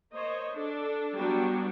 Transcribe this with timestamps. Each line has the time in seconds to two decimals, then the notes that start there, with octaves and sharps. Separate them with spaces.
0.14 A#3 C5 C#5 D#5
0.53 D4 A4
1.15 F#3 G3 B3 D4 F#4 G4